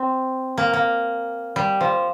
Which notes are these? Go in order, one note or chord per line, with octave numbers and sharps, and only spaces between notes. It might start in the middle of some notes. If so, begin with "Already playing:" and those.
Already playing: C4
A#3
A#3
G3
F3